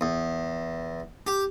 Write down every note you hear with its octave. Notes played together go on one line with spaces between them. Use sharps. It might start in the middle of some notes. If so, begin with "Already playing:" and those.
E2
G4